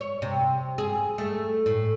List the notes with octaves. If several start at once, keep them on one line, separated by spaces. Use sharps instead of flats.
C#5
C3
G#4
A3
A2